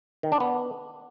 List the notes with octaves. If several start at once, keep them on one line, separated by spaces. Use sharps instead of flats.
D#3
D4
B3